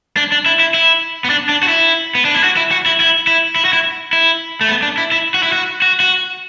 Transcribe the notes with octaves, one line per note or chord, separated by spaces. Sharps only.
D4
D4
E4
E4
E4
B3
D4
D4
F#4
E4
B3
D4
E4
F#4
E4
F#4
E4
E4
E4
E4
F#4
E4
E4
A3
B3
D4
E4
E4
F#4
E4
F#4
F#4
F#4